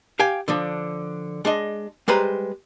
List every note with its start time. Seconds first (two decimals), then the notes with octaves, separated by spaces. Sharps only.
0.19 G4 F5 G5 G#5
0.48 D3 F3 D4
1.45 G#3 D4 D#5
2.08 G3 G#3 B4 C5 A#5